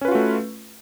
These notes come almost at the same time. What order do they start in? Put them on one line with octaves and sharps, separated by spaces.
C#4 B4 F4 F#4 A3